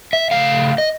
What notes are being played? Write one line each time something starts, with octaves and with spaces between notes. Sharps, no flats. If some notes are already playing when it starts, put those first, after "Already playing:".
E5
C#3 F3 A3 F5
D#5